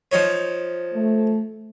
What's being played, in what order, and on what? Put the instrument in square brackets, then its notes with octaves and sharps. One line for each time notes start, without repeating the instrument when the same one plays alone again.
[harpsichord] F3 D#4 C#5
[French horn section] A3